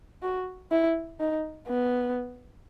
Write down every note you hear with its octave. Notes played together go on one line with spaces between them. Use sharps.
F#4
E4
D#4
B3